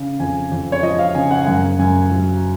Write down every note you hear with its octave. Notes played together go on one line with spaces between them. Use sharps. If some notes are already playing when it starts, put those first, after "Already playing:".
Already playing: C#3
F2 G#5
F2
C#5
F3 D#5
F5
C#3 G#5
F#5
G#5
F#2 F#5
F#2 G#5
F#3